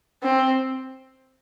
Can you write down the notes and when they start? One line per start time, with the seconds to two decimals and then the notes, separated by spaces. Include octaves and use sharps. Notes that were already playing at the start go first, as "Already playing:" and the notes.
0.23 C4